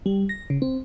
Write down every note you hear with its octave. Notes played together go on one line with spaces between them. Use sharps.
G3
A#6
C#3
C4